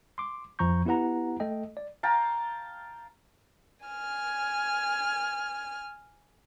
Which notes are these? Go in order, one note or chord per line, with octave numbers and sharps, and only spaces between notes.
C6 D6
F2 F3 A#5 C#6 G6
B3 E4 G4 B4 F#5 A#5
A3 A4 D#5 G5
D5
F5 G5 A5 A#5
G#5 F6